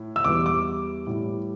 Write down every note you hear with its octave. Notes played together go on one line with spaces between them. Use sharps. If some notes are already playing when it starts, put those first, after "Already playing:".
Already playing: A2
E6
E2 E3 G3 D6
D6
A2 G3